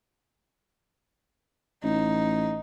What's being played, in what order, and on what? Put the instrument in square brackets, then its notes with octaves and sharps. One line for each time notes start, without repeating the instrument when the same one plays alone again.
[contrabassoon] A1 [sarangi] D#4